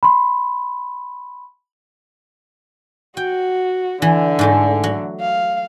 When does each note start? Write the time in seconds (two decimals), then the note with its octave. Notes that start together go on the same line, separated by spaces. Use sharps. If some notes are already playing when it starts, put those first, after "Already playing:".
0.03 B5 C6
3.17 F#4 G5
4.02 D3 E3
4.39 G#2 G#3 A3
4.84 F#3
5.20 F5